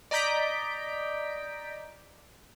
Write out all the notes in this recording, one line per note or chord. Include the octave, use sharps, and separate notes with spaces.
D5 D#5 A#5 G6 B6 D7